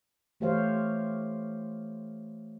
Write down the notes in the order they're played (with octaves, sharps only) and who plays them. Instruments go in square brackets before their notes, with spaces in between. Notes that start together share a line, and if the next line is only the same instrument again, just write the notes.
[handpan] E3 A3 G4 C5 C#5 F5